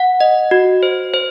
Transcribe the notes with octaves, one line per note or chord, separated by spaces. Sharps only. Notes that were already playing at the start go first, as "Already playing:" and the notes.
Already playing: F#5
D#5
F#4
C5
C5